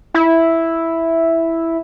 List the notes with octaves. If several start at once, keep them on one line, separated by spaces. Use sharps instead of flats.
E4